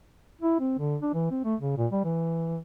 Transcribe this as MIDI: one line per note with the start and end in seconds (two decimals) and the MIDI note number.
0.41 0.57 64
0.60 0.78 60
0.78 0.96 50
1.02 1.12 62
1.14 1.30 52
1.31 1.43 60
1.44 1.55 57
1.61 1.76 49
1.77 1.87 46
1.92 2.02 55
2.04 2.59 52